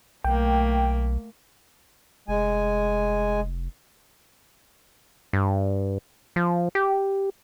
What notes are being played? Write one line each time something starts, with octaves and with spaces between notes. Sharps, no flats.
B1 A3 A#3 G5
F1 G#3 G#5
G2
F3
G4